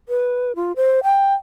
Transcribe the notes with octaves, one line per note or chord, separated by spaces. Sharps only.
B4
F4
C5
G5